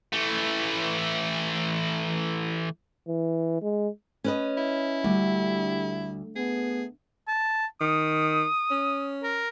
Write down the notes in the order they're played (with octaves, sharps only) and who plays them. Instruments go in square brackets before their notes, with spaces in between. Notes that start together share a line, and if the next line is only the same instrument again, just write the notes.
[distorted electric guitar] E3 A3
[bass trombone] E3
G#3
[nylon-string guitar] C#4 B4 D#5
[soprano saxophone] E4
[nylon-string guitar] D2 [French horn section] D3 D4 G4 [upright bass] G3
[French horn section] A3 B3 [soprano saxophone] G#4
[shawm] A5
[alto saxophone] D#3 [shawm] D#6
[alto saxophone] C#4
[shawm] A#4